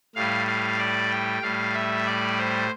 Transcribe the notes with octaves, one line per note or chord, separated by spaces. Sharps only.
A2 G3 F5
F5
D5
G5
A2 G3 F5
E5
D5
C5